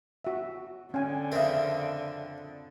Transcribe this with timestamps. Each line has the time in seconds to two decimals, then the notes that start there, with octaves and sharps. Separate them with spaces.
0.24 F#4 E5
0.94 D3 C#4 G5 G#5
1.32 F2 C#3 C4 A#4 E5